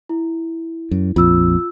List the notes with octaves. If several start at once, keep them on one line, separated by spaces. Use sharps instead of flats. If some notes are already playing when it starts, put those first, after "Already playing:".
E4
F#2
A#1 F2 F4 E6